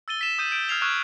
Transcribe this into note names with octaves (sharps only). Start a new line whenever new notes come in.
E6 A6 D#7 G7
B6 E7
D#6 G6 D#7 E7
G6 D7 E7
D#6 F6 G#6 C7 F7 G7
C#6 D#6 F6 F#6 G#6 E7